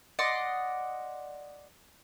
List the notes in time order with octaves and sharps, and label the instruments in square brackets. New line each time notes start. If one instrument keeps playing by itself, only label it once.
[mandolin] D5 D#5 F#5 C6